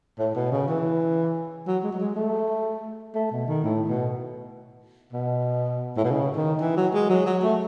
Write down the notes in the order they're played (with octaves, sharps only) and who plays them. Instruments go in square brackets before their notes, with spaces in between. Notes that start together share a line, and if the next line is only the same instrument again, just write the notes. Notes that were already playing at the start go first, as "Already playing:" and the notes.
[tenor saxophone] A2
B2
C#3
E3
F#3
G#3
F#3
G#3
A3
A3
B2
D#3
A2
B2
B2
A2
B2
C#3
D#3
E3
F#3
G#3
F#3
F#3
A3